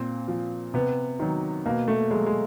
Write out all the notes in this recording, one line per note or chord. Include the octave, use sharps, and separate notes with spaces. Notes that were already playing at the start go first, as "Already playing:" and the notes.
Already playing: A#2 C4
F3
C3 B3
D#3 F#3
B2 A#3
A3
F#3 G#3
G#3